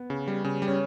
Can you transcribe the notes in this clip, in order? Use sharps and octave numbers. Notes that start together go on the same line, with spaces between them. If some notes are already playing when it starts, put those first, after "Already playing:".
Already playing: B3
C#3
G3
C#3
G3
C#4